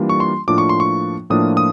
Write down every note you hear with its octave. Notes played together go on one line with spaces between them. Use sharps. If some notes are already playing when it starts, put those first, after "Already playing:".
Already playing: E3 G3 A#3 D4 F4
C#6
C6
A2 F3 A#3 D4 F4 D6
C#6
C6
C#6
A2 F3 A#3 D4 F4 D#6
D#6